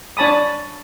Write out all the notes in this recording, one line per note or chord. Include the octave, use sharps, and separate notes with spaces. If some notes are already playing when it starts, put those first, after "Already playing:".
D4 C#5 A5 B5 D#6